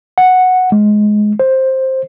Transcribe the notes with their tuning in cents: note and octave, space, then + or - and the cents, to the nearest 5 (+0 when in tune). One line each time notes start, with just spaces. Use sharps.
F#5 -5
G#3 +15
C5 +10